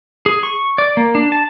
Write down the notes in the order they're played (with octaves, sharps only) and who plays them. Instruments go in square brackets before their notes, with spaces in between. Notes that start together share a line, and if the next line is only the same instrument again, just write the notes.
[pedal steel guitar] G#4
C#6
D5
A#3
D4
A5